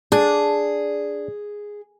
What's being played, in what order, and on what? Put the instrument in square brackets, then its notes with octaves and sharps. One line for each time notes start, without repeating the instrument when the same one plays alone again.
[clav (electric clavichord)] D4 [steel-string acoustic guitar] G#4